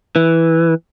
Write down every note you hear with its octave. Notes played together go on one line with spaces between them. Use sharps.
E3